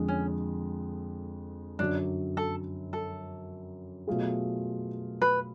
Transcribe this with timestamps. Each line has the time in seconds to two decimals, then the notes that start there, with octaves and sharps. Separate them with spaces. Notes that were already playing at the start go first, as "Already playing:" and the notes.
Already playing: F2 D3 G#3
0.08 C#4
1.79 F#2 D3 F#3 D4
2.37 A4
2.93 A4
4.07 B2 F#3 A3 F4 G#4
5.22 B4